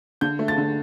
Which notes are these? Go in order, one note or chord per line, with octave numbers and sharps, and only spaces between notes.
D3 G6
A3
A6
D3